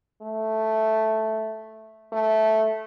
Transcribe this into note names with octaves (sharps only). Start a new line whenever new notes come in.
A3
A3